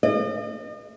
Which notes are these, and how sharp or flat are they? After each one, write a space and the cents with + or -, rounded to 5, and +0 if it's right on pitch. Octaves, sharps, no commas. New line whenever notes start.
D#5 -40